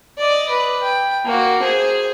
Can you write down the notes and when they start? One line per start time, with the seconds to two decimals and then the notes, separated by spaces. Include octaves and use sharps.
0.18 D5 D#5
0.49 B4
0.82 G5
1.25 A#3 F#4
1.62 G#4 C5